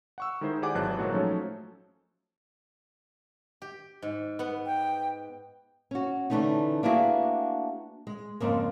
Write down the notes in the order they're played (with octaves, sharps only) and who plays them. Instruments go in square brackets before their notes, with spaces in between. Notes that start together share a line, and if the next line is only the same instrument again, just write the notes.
[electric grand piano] F#5 C#6 E6
D#3 G#3 E4 G#4 C5
G4 G#4 D5 F#5 G#5 D6
G#1 E3 F#3 C5 A5 F#6
A#2 F#3 G#3 A#3 F#4
F3 F#3 A3 C#4 D#4 A4
[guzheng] G4
G#2
B3 F#5
[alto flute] G5
[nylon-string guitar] C#4 F#4
D3 E3 F3 A3 C#4 D#4
A#3 B3 D4 E4 F#4 G#4
G#3
F2 G#2 C#3 A#3